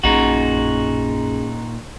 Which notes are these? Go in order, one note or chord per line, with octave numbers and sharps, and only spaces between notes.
A#1 F#2 A#2 C#4 D#4 F#4 G#4